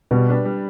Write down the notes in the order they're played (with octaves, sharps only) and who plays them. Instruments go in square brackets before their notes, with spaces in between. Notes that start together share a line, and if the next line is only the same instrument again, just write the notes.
[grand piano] B2 [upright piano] G3
[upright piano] D4 G4 B4
G3